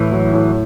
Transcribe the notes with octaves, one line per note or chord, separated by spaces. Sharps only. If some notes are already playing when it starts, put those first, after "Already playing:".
Already playing: A2 E3
F#3
A2